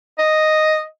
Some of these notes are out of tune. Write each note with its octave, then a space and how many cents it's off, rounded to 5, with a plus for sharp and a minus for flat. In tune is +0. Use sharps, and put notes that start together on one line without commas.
D#5 +0